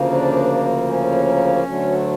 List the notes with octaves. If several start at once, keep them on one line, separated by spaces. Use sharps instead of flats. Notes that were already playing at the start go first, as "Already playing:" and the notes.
Already playing: D2 C#3 F3 A#3
D4
C#4
D2 D3 F#3 A3